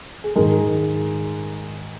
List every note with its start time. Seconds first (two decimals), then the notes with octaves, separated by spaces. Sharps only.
0.24 G#4
0.36 G#2 D#3 G#3 A#4